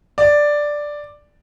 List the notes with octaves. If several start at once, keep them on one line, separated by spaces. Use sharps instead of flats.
D5